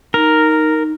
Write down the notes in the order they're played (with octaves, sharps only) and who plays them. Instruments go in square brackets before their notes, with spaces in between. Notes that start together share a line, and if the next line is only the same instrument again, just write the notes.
[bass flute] D#4 [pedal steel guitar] A#4